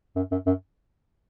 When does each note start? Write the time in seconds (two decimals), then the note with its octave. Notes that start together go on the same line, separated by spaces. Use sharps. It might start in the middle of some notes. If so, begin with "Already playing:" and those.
0.16 F#2
0.32 F#2
0.47 F#2